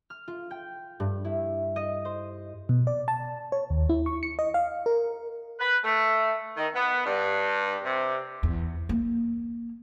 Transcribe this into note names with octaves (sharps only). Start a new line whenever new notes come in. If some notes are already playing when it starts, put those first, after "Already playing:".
F6
F4
G5
G2
E4
D#5
C5
B2
D5
A5
C#5
D#2
E4
C#6
C#7
D#5
F5
A#4
B4
A3
D#3
B3
G2
C3
E2
A#3